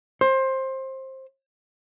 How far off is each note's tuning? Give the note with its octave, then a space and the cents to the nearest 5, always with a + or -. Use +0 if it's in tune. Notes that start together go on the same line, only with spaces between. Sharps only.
C5 +20